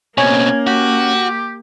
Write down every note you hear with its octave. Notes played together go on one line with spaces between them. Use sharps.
B2 A#3 C4 C#4 G#5
F#4 G4